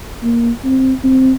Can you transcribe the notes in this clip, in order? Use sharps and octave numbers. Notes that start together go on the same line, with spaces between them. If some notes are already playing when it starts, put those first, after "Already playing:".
A#3
C4
C4